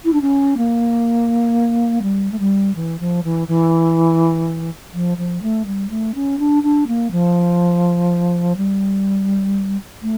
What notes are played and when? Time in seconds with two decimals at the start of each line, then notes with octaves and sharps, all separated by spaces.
0.05 E4
0.13 D4
0.21 C#4
0.57 A#3
2.02 G3
2.32 A3
2.39 G3
2.75 E3
3.00 F3
3.24 E3
3.48 E3
4.94 F3
5.18 F3
5.42 A3
5.66 G3
5.90 A3
6.15 C#4
6.39 D4
6.63 D4
6.87 A#3
7.11 F3
8.57 G3
10.02 A3